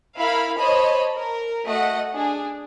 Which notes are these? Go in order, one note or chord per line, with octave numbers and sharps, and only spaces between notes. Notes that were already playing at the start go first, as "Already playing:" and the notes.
E4 A#4 F5 B5
C5 C#5 D#5 A5 B5
A#4
A3 F#4 D#5 F#5
D4 G#4